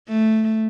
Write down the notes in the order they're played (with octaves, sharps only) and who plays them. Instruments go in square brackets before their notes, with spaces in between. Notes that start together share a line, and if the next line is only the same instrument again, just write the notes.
[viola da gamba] A3